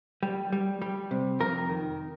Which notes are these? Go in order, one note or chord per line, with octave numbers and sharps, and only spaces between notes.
G3
G3
G3
C3
F2 A#4
D#3